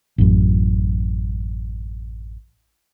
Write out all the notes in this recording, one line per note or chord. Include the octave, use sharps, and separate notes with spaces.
A1 F#2